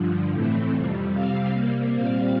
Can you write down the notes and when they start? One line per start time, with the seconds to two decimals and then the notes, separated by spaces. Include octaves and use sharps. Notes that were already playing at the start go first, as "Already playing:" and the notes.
Already playing: G2 D3 F3
0.30 A2 E3 A3 C4
0.71 F2 C3 G3
1.11 C3 G3 C4 F5
1.52 C3 G3 A#3
1.92 A#2 G3 C4 F5